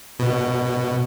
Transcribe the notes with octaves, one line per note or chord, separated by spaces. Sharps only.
B2